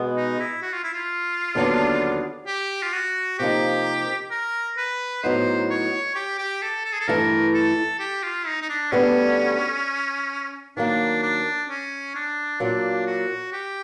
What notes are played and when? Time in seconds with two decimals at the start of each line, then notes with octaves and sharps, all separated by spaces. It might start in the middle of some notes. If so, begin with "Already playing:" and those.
Already playing: B2 G#3 B3
0.17 D#4
0.40 E4
0.62 F#4
0.73 F4
0.84 E4
0.93 F4
1.55 D#2 D3 F#3 B3 D4
2.47 G4
2.82 F4
2.93 F#4
3.39 C3 F3 A#3 D#4 G4
4.31 A#4
4.77 B4
5.23 A2 F#3 B3 D#4 C5
5.70 C#5
6.15 G4
6.39 G4
6.62 A4
6.85 A4
6.92 G#4
7.00 A4
7.08 G2 E3 A3 A#4
7.54 A4
8.00 G4
8.23 F4
8.47 D#4
8.62 D#4
8.69 D4
8.92 D2 D3 G3 B3 C#4
10.77 D#3 F#3 A#3 D4
11.22 D4
11.69 C#4
12.15 D4
12.60 A#2 F#3 A#3 D4
13.06 F#4
13.53 G4